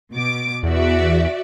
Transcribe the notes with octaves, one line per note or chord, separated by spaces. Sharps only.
B2 D6
E2 F#4 D5 E5